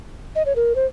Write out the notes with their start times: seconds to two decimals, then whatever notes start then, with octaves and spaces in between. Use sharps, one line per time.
0.36 D#5
0.46 C#5
0.56 A#4
0.75 C5